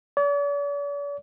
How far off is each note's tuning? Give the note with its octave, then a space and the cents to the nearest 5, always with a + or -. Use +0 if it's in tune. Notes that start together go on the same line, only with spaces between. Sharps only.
D5 -45